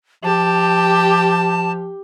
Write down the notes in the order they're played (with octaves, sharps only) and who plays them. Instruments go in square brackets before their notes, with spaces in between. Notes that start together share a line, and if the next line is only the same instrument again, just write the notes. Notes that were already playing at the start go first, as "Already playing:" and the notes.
[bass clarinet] F3 [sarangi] G4 [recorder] A5